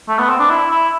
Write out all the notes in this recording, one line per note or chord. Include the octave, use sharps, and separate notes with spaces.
A3
B3
C4
D4
E4
E4